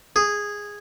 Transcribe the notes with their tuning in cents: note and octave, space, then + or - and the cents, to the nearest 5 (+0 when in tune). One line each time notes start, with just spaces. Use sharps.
G#4 -10